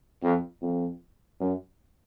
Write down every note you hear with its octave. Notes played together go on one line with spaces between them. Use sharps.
F2
F2
F#2